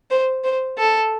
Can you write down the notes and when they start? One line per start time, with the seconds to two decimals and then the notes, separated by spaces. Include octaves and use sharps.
0.11 C5
0.44 C5
0.78 A4